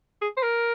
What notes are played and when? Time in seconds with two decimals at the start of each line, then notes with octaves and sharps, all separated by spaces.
0.22 G#4
0.37 C5
0.43 A#4